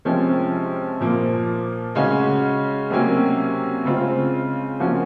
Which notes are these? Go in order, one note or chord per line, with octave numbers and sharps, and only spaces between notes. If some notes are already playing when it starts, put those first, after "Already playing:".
C3 F3 G#3 C#4
A#2 F3 A#3
C#3 G#3 C#4 F#4
C3 F#3 A#3 C#4
C#3 G#3 C4 F4
F3 A#3 C#4 F#4